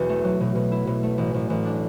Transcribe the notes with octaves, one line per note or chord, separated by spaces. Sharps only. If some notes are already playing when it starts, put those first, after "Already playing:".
Already playing: B1 E2
A3
F#3
B2
B2
E4
B2
A3
A1
A1
A1
D4